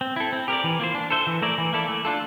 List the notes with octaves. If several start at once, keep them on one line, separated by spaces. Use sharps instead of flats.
C4
E4 A4
C4
G4 A#4 D5
E3
A#3 F4 C5
D4
A4 C5 E5
E3
A3 E4 A#4 D5
E3
A#3 E4 A4 D5
A3
D4 F4 A4